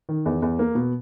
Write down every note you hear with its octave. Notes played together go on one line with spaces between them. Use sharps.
D#3
E2
E2
A#3
B2